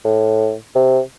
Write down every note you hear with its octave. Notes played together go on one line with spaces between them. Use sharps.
A2
C3